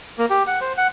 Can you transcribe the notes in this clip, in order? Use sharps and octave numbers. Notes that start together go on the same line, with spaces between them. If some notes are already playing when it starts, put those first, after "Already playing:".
A#3
G4
F#5
C5
F#5